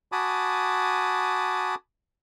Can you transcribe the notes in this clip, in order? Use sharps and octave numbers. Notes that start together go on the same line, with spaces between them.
F#4 G#5 A5 B5 D6 D#6